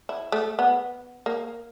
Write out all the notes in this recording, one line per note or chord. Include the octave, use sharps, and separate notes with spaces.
E4
A3
B3
A#3